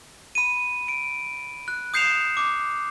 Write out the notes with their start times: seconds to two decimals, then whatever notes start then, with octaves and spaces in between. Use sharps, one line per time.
0.35 B5 D#7
0.88 D7
1.68 F#6
1.94 D#6 G6 C7 C#7 E7 F7
2.37 D6